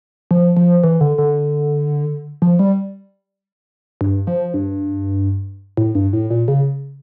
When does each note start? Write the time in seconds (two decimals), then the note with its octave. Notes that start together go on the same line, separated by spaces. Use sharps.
0.31 F3
0.57 F3
0.84 E3
1.01 D3
1.18 D3
2.42 F3
2.59 G3
4.01 G2
4.27 F3
4.54 G2
5.77 A2
5.95 G2
6.13 A2
6.30 A#2
6.48 C#3